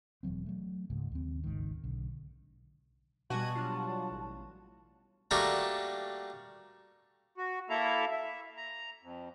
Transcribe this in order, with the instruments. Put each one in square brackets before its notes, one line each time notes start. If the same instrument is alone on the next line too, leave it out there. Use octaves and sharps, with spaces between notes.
[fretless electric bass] E1 E3 F#3 C4
F#3 A3
C#2 G#2 C#3 F#3
D#2 C4
G#1 C#2 G#2 D#3
B1 D3
[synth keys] B2 G3 [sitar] F#4 [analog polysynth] D#5 G#5 G#6 [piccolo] A5
[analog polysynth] F#3 D4 F4
A1
[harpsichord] G3 A3 A#3 D4 F#4
[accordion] F#4
A#3 E4 A4 E5 F5 A#5
E5
A#5
F2